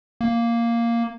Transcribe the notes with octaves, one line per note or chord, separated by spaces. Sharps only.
A#3